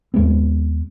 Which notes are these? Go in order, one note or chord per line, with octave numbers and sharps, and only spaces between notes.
D#2 G#3 B3 C4